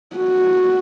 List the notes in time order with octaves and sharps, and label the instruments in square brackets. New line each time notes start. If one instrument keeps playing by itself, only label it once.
[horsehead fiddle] F#4